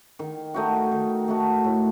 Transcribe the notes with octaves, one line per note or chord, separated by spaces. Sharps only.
D#3
A3 D#4 F#4
D#3
A3 D#4 F#4
A2